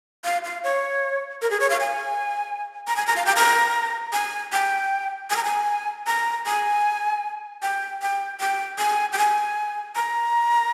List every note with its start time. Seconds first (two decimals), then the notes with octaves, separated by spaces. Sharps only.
0.24 F5
0.44 F5
0.64 C#5
1.42 A#4
1.50 G#4
1.60 C#5
1.70 F5
1.80 G#5
2.87 A#5
2.96 G#5
3.07 A#5
3.16 F5
3.26 G5
3.36 A#5
4.13 G#5
4.53 G5
5.30 G#5
5.36 A#5
5.45 G#5
6.07 A#5
6.46 G#5
7.62 G5
8.02 G5
8.40 G5
8.78 G#5
9.13 G5
9.18 G#5
9.96 A#5